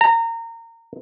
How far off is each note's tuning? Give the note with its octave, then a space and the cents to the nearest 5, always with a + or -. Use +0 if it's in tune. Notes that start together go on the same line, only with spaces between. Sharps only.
A#5 -25